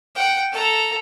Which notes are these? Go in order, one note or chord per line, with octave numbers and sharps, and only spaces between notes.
F#5 G5
A4 A#5